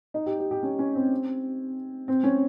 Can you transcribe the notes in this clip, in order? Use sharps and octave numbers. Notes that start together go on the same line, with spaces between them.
D#4
G4
G4
G4
C#4
C#4
C4
C4
C#4